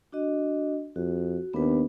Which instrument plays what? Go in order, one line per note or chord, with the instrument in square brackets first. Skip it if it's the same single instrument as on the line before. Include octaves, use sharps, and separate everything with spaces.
[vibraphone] D4 F#4 D#5
[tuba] F2 [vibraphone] F#4
[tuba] D#2 [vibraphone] B3 D4 B4